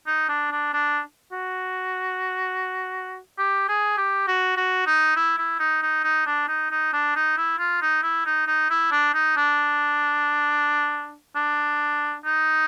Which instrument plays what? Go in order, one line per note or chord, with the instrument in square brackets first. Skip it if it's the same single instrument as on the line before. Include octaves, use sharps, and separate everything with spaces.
[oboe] D#4
D4
D4
D4
F#4
G4
G#4
G4
F#4
F#4
D#4
E4
E4
D#4
D#4
D#4
D4
D#4
D#4
D4
D#4
E4
F4
D#4
E4
D#4
D#4
E4
D4
D#4
D4
D4
D#4